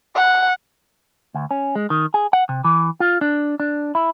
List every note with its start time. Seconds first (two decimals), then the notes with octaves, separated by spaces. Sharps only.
0.16 F#5
1.34 D2
1.51 C#4
1.75 G#3
1.90 D#3
2.14 G#4
2.33 F#5
2.49 C3
2.64 E3
3.00 F4
3.21 D4
3.60 D4
3.95 E4